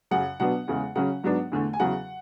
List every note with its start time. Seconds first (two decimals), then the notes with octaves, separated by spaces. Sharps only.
0.11 F#2 C#3 F#3 F#5
0.40 B2 F#3 B3 D4 F#5
0.68 E2 C#3 G#3
0.96 C#3 F#3 C#4 F#5
1.24 G#2 F#3 B3 D4
1.52 E2 D3 A3
1.73 G#5
1.80 E2 C#3 F#3 F#5